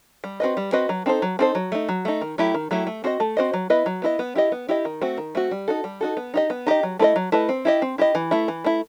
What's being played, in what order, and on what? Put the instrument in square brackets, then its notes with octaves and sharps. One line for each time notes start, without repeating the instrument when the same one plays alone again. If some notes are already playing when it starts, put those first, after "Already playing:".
[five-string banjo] G3
C4 F#4 B4 D#5
G3
C4 F#4 B4 D#5
F#3
C4 D#4 A4 C5
F#3
C4 D#4 A4 C5
F#3
A3 D#4
F#3
A3 D#4
D#3
F#3 A3 E4 G4
D#3
F#3 A3 E4 G4
A3
C4 F#4 C5 D#5
A3
C4 F#4 C5 D#5
F#3
B3 E4 B4 D#5
F#3
B3 E4 B4 D#5
B3
E4 G4 D#5
B3
E4 G4 D#5
D#3
A3 C4 F#4
D#3
A3 C4 F#4
G3
D#4 F#4 A4
G3
D#4 F#4 A4
B3
D#4 G4 D#5
B3
D#4 G4 D#5
F#3
A3 E4 B4 D#5
F#3
A3 E4 B4 D#5
C4
E4 G4 D#5
C4
E4 G4 D#5
E3
A3 E4
E3
A3 E4